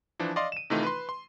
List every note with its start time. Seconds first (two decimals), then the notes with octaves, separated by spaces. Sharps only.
0.19 E3 F3 D4
0.36 D5 D#5 F5 C6
0.52 D#7 E7
0.70 C3 D#3 E3 A3 D#4 F4
0.83 B4 C6
1.09 C6